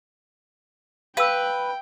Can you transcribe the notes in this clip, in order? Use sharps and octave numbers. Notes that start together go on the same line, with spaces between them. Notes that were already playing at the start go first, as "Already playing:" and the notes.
B4 F5 G5 E6